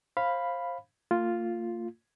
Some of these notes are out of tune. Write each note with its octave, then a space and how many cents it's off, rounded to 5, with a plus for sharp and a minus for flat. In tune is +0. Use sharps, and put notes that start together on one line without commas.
C5 +25 F5 +0 B5 +0
A#3 -45 F4 +0